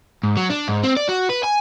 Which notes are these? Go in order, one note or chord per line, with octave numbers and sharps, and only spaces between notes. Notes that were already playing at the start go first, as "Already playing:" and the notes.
G#2
F#3
D4
G#2
C4
D5
F#4
B4
G#5